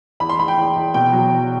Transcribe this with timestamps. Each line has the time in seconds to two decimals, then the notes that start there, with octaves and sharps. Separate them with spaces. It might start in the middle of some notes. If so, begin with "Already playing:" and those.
0.20 E2 B5
0.29 C6
0.39 E2 B5
0.48 G5
0.57 E2
0.76 E2
0.94 B2 G5
1.13 F#3
1.31 F#3